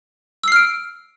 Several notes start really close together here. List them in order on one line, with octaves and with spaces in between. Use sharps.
E6 C7 F6 D7